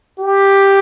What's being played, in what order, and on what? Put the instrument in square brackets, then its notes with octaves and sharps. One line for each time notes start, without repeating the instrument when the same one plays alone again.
[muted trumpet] G4